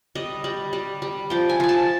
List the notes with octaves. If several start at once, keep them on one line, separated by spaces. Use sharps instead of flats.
G3 D#5
G3
G3
G3
F3 G5
G#5
F3 G#5
A5